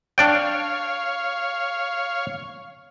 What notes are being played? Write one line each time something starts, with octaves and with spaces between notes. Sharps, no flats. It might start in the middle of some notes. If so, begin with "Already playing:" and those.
D4 C#5 D5 F5 G5